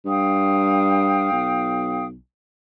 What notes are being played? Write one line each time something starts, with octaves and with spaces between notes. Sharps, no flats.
G2 F5 G5 D#6
B1